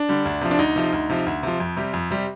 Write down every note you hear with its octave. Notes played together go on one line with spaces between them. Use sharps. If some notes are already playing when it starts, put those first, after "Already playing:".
Already playing: D4
D3 G3
D2
C3 F3
D4
D2 D#4
C3 F3
D2
C3 F3
D2
C3 F3
F2
C3 G3
F2
C3 G3